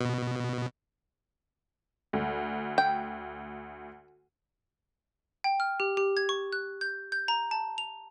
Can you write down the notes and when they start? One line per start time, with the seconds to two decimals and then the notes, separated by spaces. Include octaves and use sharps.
0.01 B2
2.13 D2
2.78 G5
5.44 G5
5.60 F6
5.80 G4
5.97 G4
6.17 G#6
6.29 C#6
6.53 F#6
6.81 G6
7.12 G6
7.28 A#5
7.51 A5
7.78 F7